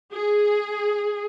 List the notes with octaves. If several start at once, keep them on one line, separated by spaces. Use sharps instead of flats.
G#4